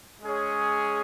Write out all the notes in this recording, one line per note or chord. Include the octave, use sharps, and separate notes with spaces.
G#3 C#4 G#4 C#5